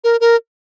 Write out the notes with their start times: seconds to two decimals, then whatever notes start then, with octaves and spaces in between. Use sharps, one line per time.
0.04 A#4
0.21 A#4